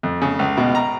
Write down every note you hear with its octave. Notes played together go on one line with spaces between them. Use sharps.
F2
C#3
C#2
B2
A#5